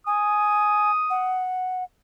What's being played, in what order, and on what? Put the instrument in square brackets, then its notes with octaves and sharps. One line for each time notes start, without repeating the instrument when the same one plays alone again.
[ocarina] G#5 [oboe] D#6
[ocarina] F#5